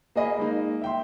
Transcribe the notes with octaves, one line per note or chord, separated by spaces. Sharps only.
A#3 G#4 D#5 B5
G#3 A#3 D#4
E5 G5 C6